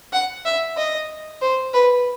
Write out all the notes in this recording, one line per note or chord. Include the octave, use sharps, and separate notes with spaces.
F#5
E5
D#5
C5
B4